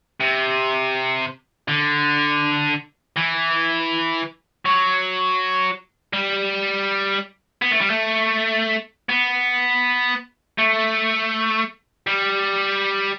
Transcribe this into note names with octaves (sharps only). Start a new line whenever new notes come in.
C3
D3
E3
F#3
G3
B3
A3
G3
A3
B3
A3
G3